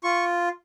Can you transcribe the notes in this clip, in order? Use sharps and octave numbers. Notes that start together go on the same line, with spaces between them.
F4 C#6